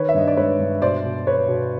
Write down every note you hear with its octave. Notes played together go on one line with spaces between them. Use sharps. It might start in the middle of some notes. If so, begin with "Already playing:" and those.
Already playing: D#3 B4 C#5
E5
G2 D#5
D5
G#3 B4 C#5
G2
B2 C5 D5
B2
B3 B4 C#5
B2